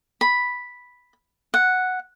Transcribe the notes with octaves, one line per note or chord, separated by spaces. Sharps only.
B5
F#5